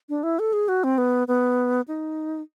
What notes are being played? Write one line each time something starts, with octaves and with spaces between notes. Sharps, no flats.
D4
E4
A4
G#4
F#4
C4
B3
B3
D#4